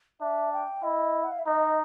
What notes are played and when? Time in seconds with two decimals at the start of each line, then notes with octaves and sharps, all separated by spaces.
0.21 D4 E5
0.53 G5
0.83 E4 D#5
1.24 F#5
1.32 F5
1.39 E5
1.46 D#4 D#5